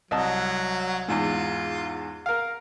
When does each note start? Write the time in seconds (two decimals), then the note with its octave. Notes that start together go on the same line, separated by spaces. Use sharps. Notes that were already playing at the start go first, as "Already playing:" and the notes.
0.11 C2 F#3 D#5 A5
1.08 E2 G#2 F4
2.26 A#4 F5